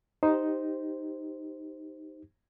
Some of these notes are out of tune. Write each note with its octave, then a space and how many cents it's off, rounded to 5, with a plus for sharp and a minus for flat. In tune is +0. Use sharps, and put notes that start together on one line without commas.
D#4 +0 G4 +0 C5 +0